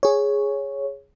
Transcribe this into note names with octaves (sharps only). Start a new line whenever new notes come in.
G#4 C#5